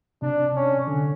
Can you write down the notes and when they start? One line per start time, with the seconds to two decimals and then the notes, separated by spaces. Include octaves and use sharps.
0.22 C3 D4
0.56 C#4
0.88 D3